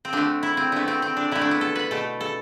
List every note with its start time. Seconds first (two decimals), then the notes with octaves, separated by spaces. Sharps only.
0.05 C4
0.13 D3 A3 D4
0.43 E4
0.57 C4
0.72 D3 A3 B3
0.88 C4
1.02 C4
1.17 D4
1.31 D3 A3 E4
1.41 D4
1.51 B3
1.61 A4
1.75 B4
1.91 B2 A3 A4
2.21 A4